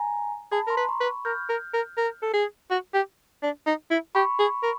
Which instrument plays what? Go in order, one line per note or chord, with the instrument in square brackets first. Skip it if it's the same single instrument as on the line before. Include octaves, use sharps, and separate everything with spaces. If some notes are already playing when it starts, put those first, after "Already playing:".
Already playing: [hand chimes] G#5 A#5
[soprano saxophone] G#4 [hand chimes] A5 B5
[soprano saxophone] A#4 [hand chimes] A#5 C6
[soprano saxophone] B4
[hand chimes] B5 C#6
[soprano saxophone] B4
[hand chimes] B5 C#6
[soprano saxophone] A#4 [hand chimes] F6 G6
[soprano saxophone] A#4
A#4
A#4
A4
G#4
F#4
G4
D4
D#4
E4
[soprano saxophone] G4 [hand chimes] B5 C#6
[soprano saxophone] G#4
A#4